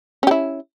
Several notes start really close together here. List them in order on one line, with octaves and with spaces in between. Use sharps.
C#4 G4 E4